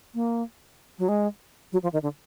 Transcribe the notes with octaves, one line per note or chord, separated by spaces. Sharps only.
A#3
F#3
G#3
F#3
F3
D#3
D3